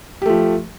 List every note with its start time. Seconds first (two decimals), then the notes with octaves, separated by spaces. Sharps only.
0.22 G4
0.26 A3
0.30 F3